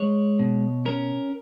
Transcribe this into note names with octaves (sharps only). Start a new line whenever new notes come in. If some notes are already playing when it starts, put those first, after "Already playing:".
Already playing: G#3 C#5
B2
C#4 A#4